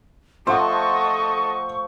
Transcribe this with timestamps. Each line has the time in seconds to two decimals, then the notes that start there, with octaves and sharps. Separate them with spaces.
0.47 F3 A3 A4 C5 D#5 F#5 C6 C#6